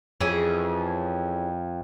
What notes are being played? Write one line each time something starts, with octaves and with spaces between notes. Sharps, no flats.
F2 E3 C#4 G#4